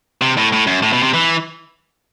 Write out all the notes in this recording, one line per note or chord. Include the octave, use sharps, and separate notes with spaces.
C3
A2
A2
F#2
A2
B2
C3
E3